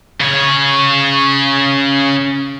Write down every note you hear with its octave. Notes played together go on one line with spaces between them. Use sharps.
C#3 C#5